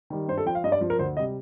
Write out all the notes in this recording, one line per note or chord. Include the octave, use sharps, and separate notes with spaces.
D#3 G3
G2 C5
A4
F3 G5
F5
G2 D#5
D5
F3
A#4
D2 C5
C3 G3 D#5